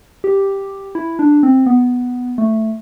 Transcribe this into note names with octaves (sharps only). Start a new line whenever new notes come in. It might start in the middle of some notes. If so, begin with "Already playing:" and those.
G4
E4
D4
C4
B3
A3